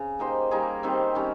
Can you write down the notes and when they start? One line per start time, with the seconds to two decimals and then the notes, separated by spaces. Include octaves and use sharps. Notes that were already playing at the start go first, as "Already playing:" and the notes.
Already playing: C#3
0.19 A#3 D#4 G4 C5
0.51 G3 A#3 D#4 G#4
0.83 D#3 G3 C4
1.15 D#3 G3 C#4